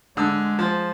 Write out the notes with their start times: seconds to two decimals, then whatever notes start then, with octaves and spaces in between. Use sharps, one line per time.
0.17 D3 G#3 E6
0.59 F3